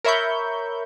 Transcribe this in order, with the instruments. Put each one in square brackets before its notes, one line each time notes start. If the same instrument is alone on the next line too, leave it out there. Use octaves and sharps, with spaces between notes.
[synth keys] A#4 C#5 E5 B5 C#6 G6